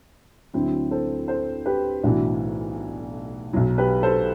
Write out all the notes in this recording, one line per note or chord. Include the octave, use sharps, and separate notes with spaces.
D2 D3 F#3 C4 E4
A4 C5
A4 C5
G4 B4
B1 A2 E3 D4 F#4
B1 B2 F#3
G4 B4
A4 C5